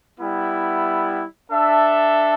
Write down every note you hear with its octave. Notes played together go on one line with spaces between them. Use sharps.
G3 B3 E4
D4 A4 E5